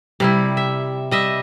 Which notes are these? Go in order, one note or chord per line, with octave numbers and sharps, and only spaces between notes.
C3 G3 E4
E5
G3 D#5 E5